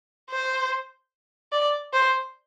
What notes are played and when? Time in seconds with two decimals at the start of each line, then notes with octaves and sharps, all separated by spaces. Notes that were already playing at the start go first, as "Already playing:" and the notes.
0.31 C5
1.53 D5
1.93 C5